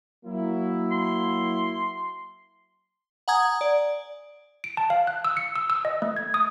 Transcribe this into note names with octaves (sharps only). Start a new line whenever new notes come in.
F#3 A#3 E4
C6
F#5 G#5 A#5 D#6 G#6
D5
D7
A5
F5
F#6
E6
C#7
E6
E6
D#5
A3
G#6
D#6